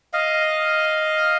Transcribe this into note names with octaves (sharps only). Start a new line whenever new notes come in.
D#5 F5